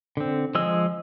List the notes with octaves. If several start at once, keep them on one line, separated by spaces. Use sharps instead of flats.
D3 C4
F3 G#3 G#4 D#5 E6